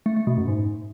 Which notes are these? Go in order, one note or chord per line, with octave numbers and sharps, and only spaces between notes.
A3
A3
B2
F#2
G#2